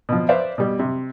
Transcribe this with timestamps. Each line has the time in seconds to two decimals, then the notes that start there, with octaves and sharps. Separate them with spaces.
0.09 B2 F3
0.29 B4 C5 D5 E5 F5
0.58 B2 G3
0.79 C3